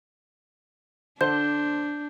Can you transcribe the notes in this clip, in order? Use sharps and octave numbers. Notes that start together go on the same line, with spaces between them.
D3 D4 C5 G6